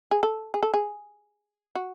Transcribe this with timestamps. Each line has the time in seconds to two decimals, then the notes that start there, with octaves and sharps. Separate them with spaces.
0.11 G#4
0.23 A4
0.54 G#4
0.63 A4
0.74 G#4
1.75 F#4